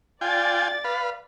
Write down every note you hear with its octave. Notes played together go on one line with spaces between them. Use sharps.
F4 D5 G5 G#5 A6
B4 F5